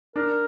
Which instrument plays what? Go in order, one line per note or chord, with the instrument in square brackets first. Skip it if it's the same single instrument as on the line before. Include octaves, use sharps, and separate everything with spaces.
[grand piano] D4 [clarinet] A#4